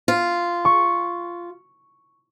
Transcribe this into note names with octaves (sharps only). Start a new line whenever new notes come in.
F4
C#6